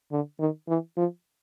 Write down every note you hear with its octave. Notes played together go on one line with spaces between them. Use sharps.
D3
D#3
E3
F3